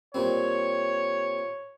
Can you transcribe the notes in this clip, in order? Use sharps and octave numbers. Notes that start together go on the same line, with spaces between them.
A#2 G3 C4 C#5